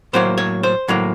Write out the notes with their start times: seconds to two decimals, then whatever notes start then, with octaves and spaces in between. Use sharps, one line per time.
0.13 A2 F#3 A#3 C5
0.38 C#5
0.63 C5
0.88 A2 F#3 A#3